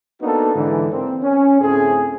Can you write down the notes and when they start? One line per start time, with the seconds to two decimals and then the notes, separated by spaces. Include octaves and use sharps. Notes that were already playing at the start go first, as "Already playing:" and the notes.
0.22 A#3 B3 D4 D#4 F#4 A4
0.55 G#2 D3 E3
0.92 A#3 C4
1.23 C#4
1.61 D2 A2 A3 C4 G#4